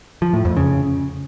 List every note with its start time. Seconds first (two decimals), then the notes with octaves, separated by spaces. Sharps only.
0.22 F3
0.33 A2
0.45 F2
0.57 C#3